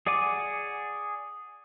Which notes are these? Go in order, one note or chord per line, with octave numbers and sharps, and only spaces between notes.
G#4 D5 F#5 G#5 D6